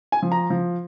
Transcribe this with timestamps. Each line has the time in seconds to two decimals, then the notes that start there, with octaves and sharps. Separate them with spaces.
0.12 G#5
0.22 F3
0.32 A#5
0.50 F3